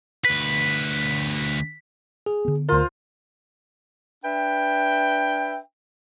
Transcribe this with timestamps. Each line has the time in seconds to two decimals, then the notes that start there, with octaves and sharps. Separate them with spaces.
0.25 D2 B4 B6
2.26 G#4
2.45 D3 B3
2.69 D2 F4 A#4 C5
4.25 D4 B4 E5 G5